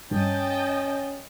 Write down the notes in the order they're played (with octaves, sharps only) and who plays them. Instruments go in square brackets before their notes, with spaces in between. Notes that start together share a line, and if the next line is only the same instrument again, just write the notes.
[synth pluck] G2 [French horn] C#4 [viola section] D#5 G5 A5